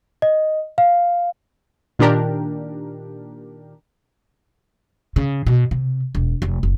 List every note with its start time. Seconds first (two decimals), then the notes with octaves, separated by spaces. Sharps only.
0.22 D#5
0.78 F5
1.99 A#2 D#3 D4 G4 A#4
5.16 C#3
5.47 B2
5.71 C3
6.15 E1
6.42 F1
6.63 F#1